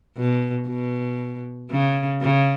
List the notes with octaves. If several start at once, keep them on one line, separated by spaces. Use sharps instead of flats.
B2
B2
C#3
C#3